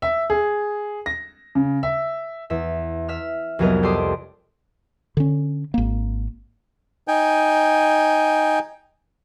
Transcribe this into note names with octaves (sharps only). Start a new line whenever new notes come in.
E5
G#4
A#6
C#3
E5
E2 E5
E5 E6 F6
C2 F2 F#3 B3 A#4 D#5
G4 A4 D5 C6 D6 D#6
D3 C#4
G#1 A#3
D#4 G5 G#5